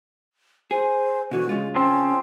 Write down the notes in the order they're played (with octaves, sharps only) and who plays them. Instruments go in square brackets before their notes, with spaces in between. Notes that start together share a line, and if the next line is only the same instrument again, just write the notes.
[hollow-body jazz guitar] G#4 [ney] C5
[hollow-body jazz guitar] B2 D3 E3 [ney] F#4
[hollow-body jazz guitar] C#3 F4 [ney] G#3
[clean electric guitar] F3 C4 [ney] C#4